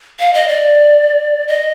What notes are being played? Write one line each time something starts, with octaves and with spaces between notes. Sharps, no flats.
F5
D#5
D5
D#5